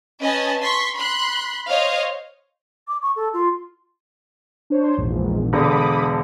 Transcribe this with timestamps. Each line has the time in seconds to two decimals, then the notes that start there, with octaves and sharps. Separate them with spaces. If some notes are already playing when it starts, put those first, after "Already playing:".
0.21 C#4 B4 D#5 G#5 A5
0.61 C6 C#6 B6
0.95 B5 C6 F#6
1.68 C5 C#5 D#5 F5
2.87 D6
3.02 C#6
3.16 A4
3.33 F4
4.70 D4 C5 C#5
4.97 A#1 E2 G#2
5.53 E1 D3 B5 D6 D#6